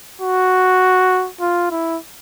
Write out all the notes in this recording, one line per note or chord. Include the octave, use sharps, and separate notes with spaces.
F#4
F4
E4